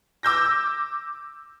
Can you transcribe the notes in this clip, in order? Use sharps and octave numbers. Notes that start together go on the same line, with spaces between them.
D6 E6 G6 A#6